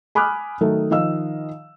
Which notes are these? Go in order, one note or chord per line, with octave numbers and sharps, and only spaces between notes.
G#5 B5 D6 D#6 F6 F#6
D#3 F#3 A3
D#3 F3 D#5 F5 E6